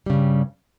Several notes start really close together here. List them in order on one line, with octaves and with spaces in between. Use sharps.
G3 C#3 G2